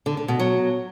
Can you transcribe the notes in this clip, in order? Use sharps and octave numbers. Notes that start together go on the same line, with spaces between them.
D3
D3
B2
F#3